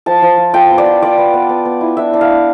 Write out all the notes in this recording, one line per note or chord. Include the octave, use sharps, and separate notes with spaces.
F3 A5
F3
F4
F4 G5
B3
D5
F4
F4 D5
B3
B3
B3
B3
E4
D4 E5
D4
F5
D4